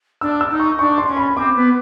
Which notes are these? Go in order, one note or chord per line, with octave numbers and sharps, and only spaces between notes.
D4 E6
E6
D#4
C#6
D4 C#6
C6
C#4
B5
C4 D6
B3